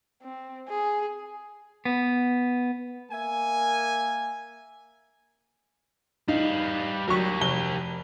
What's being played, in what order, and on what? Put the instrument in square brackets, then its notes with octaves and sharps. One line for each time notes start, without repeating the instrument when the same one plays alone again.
[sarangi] C4
G#4
[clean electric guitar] B3
[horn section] A#3 E5 G#5
[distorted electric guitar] G3 F5 [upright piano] D#4
[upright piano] F#3 C#6 [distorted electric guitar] G4 A#4
[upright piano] F1 G7